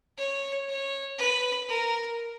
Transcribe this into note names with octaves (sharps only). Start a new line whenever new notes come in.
C#5
C#5
B4
A#4